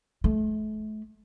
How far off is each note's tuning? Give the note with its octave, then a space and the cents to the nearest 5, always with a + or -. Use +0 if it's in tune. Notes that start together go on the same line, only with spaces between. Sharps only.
A3 -35